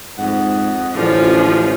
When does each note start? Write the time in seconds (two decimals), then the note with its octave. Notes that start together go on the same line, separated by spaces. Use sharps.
0.19 F2 G#2 D#5 F#5
0.95 A1 D3 F3 G#3 C#4 F4